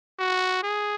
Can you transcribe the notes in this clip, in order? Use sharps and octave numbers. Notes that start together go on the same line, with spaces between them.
F#4
G#4